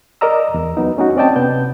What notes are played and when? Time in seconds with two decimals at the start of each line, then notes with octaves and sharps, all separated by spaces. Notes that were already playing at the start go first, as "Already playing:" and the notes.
0.21 A#4 D5 D#5 A#5 E6
0.54 E2
0.77 F#3 B3 D#4
0.97 A3 C#4 D#4 F#4
1.16 C4 C#4 D5 D#5 G5 A5
1.36 C3 B3 G6